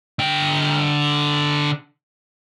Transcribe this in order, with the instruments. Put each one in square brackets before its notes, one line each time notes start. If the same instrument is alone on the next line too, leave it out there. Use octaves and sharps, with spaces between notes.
[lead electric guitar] D3 G5